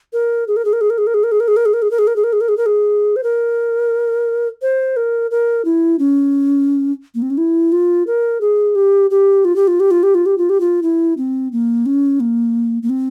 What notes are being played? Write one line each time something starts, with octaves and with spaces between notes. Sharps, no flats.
A#4
G#4
A#4
G#4
A#4
G#4
A#4
G#4
A#4
G#4
A#4
G#4
A#4
G#4
A#4
G#4
A#4
G#4
A#4
G#4
A#4
G#4
A#4
G#4
A#4
G#4
A#4
G#4
C5
A#4
C5
A#4
A#4
E4
C#4
A#3
C4
C#4
E4
F4
A#4
G#4
G4
G4
F4
G4
F4
G4
F4
G4
F4
G4
F4
G4
F4
E4
C4
A#3
C#4
A#3
A#3
C4